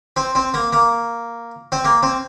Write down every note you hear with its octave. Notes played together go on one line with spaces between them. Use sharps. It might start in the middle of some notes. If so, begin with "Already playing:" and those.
C4
C4
A#3
A#3
C4
A#3
C4